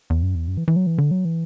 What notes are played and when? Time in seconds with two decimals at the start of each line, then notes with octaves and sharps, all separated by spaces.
0.10 E2
0.22 F#2
0.35 E2
0.48 F#2
0.57 E3
0.68 E3
0.76 F#3
0.87 E3
0.98 D3
1.11 F#3
1.25 E3